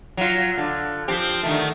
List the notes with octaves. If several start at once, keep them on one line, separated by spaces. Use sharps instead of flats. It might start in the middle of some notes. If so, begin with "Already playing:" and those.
F#3 F4
D3
F3 C4 G4
D3 D#3 A3